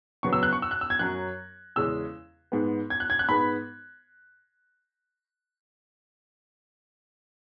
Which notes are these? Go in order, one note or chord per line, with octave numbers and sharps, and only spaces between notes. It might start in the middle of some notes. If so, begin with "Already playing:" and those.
C#3 F#3 B3 C#6
E6
F#6
C#6
E6
F#6
E6
G#6
F#2 F#3 C#4 F#6
E2 C#3 G#3 C#4 E6
G#2 G#3 B3
G#6
F#6
G#6
F#6
G#2 G#3 B3 B5